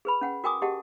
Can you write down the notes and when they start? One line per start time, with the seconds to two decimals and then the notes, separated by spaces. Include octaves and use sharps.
0.05 G#4 B4 B5
0.21 C#4 F#5 G5
0.44 F#4 A#4 G5 G#5 D6 D#6
0.62 G4 G#4 D#5 F#5 A5